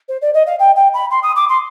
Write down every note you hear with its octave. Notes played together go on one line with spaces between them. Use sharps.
C5
D5
D#5
F5
G5
G5
B5
C6
D#6
D6
C6